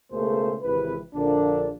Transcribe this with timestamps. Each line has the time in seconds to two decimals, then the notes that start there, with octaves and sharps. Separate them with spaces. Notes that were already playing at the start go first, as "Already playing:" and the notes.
0.12 C#2 B2 A3 A#3 G#4 C5
0.62 G#1 C3 E3 B4
1.15 A#1 D3 F3 A#3 D4